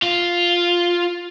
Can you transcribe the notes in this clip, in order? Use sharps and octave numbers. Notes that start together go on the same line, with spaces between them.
F4